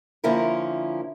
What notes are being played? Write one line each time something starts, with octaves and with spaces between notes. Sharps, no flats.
D3 F3 A#3 C#4 E4 A#4